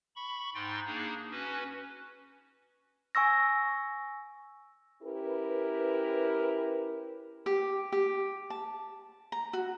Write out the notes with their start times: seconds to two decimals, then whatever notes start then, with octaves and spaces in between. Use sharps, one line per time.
0.16 B5 C#6
0.55 G#2 D#4 G5 C6 A6
0.86 A#3 D4 D#4 G#4
1.31 C#4 F#4 B4
3.15 G#5 C#6 E6 A#6
5.02 C#4 E4 G4 A#4 B4
7.46 G4
7.92 G4
8.50 A5
9.32 A#5
9.53 F#4